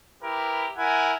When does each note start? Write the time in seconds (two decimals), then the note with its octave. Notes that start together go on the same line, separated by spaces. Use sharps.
0.22 E4 G4 A#4 B4
0.77 E4 A#4 F#5 G#5